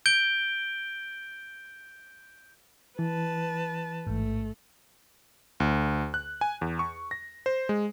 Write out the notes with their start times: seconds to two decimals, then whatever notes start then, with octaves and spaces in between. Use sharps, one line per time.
0.06 G6 D7 G7
2.99 E3 B4 A5
4.07 A1 G#2 A3
5.60 D2
6.14 F#6
6.41 G#5
6.61 E2
6.79 C#6
7.11 A#6
7.46 C5
7.69 G#3